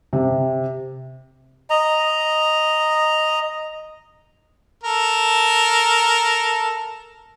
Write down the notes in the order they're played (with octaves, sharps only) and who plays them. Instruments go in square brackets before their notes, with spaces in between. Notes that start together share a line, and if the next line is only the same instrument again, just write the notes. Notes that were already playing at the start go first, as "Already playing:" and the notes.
[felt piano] C3
[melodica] D#5 A#5
[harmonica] A4 A#4